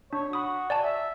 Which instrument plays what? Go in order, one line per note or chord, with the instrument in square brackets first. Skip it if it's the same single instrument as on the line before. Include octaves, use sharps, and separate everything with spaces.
[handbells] D4 [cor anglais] C#5
[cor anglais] F#4 [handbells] B5 D#6
[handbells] D5 G#5 A5
[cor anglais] E5